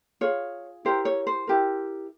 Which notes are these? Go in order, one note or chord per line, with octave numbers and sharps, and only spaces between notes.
F4 G#4 C#5
E4 G4 A#4 C5
C#5
C5
E4 G4 A#4